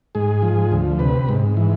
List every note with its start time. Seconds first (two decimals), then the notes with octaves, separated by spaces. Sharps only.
0.15 G#2 G#4
0.42 F3
0.72 D2
0.99 C3 B4
1.29 G#2
1.57 E3